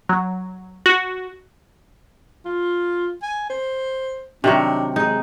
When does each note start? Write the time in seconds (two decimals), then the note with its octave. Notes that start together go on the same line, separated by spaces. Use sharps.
0.09 F#3
0.86 F#4
2.45 F4
3.22 G#5
3.50 C5
4.44 C3 D#3 F#3 D4
4.96 G#3 D#4